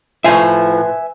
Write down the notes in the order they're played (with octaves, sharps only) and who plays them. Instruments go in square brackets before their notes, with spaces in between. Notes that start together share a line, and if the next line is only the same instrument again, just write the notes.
[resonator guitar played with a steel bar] A2 F3 [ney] B4 [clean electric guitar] E5 G#5